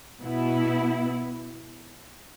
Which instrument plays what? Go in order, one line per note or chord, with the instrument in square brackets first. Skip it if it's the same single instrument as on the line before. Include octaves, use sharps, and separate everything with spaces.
[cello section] B2 B3 E4